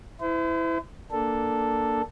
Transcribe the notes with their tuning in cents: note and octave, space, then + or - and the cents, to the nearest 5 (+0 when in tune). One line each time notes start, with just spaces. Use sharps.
E4 +0 C5 -45
A#3 +0 D4 +0 A4 +0